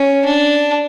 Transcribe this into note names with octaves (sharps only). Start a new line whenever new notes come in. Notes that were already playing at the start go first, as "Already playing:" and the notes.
Already playing: C#4
D4